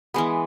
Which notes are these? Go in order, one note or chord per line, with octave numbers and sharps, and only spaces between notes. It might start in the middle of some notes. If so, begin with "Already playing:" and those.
E3 G#3 B3